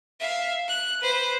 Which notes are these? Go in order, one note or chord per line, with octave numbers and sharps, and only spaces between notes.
E5 F5
F#6
B4 C5